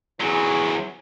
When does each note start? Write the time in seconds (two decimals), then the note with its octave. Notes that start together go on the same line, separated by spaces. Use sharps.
0.21 E2 E3 F#3 G#4